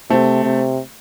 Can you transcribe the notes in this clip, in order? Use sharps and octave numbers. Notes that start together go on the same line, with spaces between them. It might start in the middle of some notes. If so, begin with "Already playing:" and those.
C3 A3 C4
C3